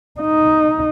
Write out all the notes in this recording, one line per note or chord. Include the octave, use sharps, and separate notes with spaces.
D#4